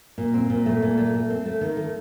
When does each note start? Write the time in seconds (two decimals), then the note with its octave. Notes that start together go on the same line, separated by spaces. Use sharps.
0.18 A#2
0.34 C4
0.50 A#2
0.66 A3
0.82 A#2
0.97 A3
1.14 A3
1.30 C4
1.46 A3
1.61 D#3
1.77 A3